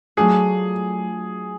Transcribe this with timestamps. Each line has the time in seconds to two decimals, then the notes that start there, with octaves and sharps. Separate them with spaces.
0.17 F#3 A3 D4 F4 G#4